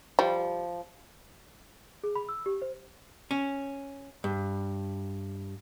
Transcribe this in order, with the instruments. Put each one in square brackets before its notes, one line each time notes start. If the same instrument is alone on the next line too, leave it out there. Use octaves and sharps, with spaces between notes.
[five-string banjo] F3 [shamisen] G3
[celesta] G#4
B5
E6
G4
C5
[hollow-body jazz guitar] C#4
G2